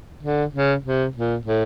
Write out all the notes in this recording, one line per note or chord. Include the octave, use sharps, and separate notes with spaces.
D3
C#3
C3
A#2
A2